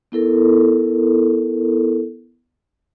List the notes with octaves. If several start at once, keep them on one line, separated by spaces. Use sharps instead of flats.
B3 E4 A4 A#4